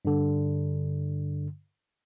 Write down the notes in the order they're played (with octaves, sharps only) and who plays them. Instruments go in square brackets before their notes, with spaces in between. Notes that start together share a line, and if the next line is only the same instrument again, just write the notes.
[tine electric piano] G2 D3